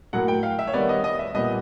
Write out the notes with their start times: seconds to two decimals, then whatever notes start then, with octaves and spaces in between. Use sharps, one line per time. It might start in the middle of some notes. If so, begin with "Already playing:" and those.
0.13 A2 F#3 A#3 F#5
0.28 G5
0.43 F5
0.59 E5
0.67 C#5
0.74 D#3 G3 B3 D5
0.89 D#5
1.04 D#5
1.19 E5
1.35 A#2 G3 B3 D#5